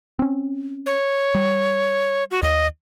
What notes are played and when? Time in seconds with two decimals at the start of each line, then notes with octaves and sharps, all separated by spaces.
0.19 C4 C#4
0.86 C#5
1.35 G3
2.31 F#4
2.43 D#2 D#5